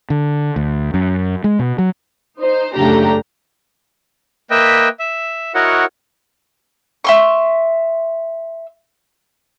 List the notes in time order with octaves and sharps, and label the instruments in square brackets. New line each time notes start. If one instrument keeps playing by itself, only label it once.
[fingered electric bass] D3
D2
F#2
G#3
B2
F#3
[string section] D#4 C5
F#2 C#3 A3 D4 G4 A#5
[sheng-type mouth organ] A#3 B4 D#5 E5 G5
E5
E4 F#4 A#4 C#5 D#5 F#5
[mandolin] E5 C6 C#6